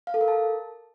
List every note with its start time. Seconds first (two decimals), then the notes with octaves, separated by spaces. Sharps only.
0.07 F5
0.14 A4
0.21 A#4
0.28 A5